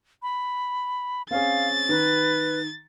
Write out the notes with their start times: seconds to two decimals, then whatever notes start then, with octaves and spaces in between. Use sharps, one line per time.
0.23 B5
1.31 C4 C#4 G#4 F5 A6
1.89 D#3 B4